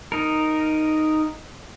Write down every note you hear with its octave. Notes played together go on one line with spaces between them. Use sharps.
D#4 A#4